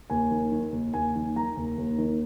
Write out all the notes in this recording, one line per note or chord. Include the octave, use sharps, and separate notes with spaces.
D#2 G#5
D#3
D#3
D#2
D#2 G#5
D#3
D#3 A#5
D#2
D#2
D#3